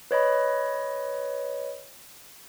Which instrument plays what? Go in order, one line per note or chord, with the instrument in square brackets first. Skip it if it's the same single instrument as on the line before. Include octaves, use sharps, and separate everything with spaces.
[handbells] B4 C#5 D#5 B5